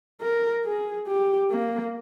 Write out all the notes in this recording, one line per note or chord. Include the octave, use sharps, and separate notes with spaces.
A#4
G#4
G4
A#3